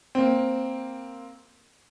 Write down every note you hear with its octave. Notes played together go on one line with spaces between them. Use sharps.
A#3 C4